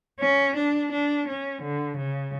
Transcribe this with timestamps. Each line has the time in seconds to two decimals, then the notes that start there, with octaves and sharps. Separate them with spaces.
0.20 C#4
0.55 D4
0.91 D4
1.27 C#4
1.61 D3
1.97 C#3